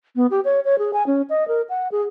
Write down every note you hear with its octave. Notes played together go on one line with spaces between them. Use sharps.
B3
G4
C#5
C#5
G#4
G#5
C#4
D#5
A#4
F#5
G#4